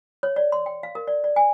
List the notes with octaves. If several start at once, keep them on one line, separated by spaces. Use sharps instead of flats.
C#5
D5
C6
G5
F5
A#4
D5
D5
G#5